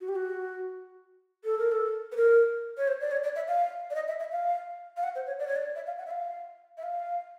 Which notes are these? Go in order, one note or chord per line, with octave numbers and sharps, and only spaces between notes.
F#4
G4
F#4
A4
A#4
A4
B4
A#4
C#5
C5
D5
C#5
D5
E5
F5
D5
D#5
E5
E5
F5
F5
F#5
C5
C#5
D5
C#5
D5
E5
F5
F#5
E5
F5
E5
F5